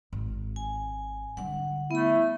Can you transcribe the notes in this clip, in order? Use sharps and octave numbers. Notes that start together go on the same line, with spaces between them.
G#1
G#5
D3 G3 F#5
A3 B3 E4 B5